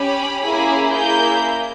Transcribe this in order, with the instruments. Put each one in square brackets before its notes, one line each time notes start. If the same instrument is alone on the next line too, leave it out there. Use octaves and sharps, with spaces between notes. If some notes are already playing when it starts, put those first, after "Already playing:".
Already playing: [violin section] C#4 G4 B5
A#3 C#4 E4 G#4 B5
A#3 E4 G#4 G6